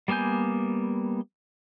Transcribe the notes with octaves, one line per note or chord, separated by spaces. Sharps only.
G3 A#3 B3 G#5 G6